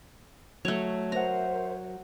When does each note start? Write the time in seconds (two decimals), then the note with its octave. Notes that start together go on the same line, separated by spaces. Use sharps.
0.65 F#3 A3 C#5
1.12 A#4 C5 C#5 E5 F#5 A#5